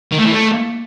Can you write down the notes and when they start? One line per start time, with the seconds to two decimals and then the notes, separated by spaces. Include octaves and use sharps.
0.12 D#3
0.18 A3
0.25 E3
0.32 A3